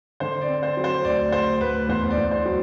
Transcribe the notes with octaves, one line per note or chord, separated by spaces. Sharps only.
D3 C5
D5
C4
C5
F#3
C5
D2 D5
D2 C5
D2 B4
E2 C5
D5
E2
C5
F#3